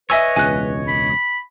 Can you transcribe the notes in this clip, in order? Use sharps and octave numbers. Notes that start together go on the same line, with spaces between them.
B4 C#5 D#5 E5 G#5 E6
E1 C#2 G#5 F#6
B5